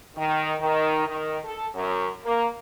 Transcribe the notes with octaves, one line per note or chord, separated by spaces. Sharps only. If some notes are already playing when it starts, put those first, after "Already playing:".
D#3
D#3
D#3
A4
F#2
A#3